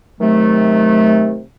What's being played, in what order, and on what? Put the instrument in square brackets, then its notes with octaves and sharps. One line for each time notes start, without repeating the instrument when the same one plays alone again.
[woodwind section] C3 D#3 F#3 A3